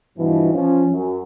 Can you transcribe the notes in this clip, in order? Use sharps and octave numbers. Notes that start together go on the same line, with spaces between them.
G2 B2 E3 F3
F3 C#4
F#2